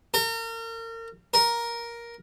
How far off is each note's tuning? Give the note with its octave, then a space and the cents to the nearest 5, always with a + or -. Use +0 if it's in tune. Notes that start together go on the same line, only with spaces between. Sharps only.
A#4 -35
A#4 +10